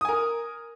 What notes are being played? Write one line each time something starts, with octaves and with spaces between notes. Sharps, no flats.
A#4 G#5 D#6